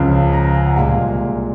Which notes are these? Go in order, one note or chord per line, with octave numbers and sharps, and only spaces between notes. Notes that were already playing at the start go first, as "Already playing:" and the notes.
Already playing: C#2 C#3 F3
A#5
A#5
G#5
F#5
C2 A#2 G#3 F5